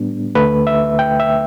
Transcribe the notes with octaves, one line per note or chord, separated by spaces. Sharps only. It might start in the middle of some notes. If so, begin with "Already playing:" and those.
Already playing: A2 G3 B3 D4
D2 D3 A3 B4
E5
G5
E5